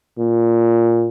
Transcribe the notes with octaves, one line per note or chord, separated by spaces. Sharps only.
A#2